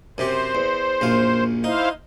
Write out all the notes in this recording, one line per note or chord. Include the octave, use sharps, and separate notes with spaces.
F#2 C3 G4 C5
E2
A#1 F#2 F5
D#4 E4 C5 F5